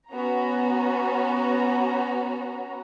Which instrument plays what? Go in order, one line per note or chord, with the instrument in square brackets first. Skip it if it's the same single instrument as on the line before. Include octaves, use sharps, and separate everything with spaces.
[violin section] B3 C#4 F#4 A#5